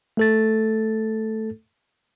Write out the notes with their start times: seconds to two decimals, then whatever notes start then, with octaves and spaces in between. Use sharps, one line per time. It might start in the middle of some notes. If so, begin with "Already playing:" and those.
0.17 A3 A4 A6